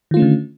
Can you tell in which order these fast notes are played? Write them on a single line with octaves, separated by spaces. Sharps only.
D#3 F4 A3 C#4 D3